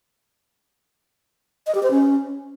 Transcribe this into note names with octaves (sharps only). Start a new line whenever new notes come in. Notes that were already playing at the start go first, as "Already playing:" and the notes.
D#5
G4
C5
C#4